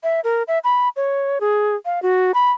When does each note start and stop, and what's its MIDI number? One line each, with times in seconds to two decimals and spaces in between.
0.03 0.20 76
0.24 0.43 70
0.48 0.59 76
0.64 0.89 83
0.96 1.38 73
1.41 1.75 68
1.85 2.02 77
2.02 2.32 66
2.34 2.51 83